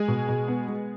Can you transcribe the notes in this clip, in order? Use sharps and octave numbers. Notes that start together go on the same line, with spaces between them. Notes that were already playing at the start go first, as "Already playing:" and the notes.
Already playing: G#3 G#4
B2
B2
B3
G#3